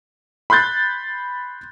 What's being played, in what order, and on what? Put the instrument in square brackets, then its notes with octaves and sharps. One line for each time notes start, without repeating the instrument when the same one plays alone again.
[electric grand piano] B5 C6 F#6 G6 A6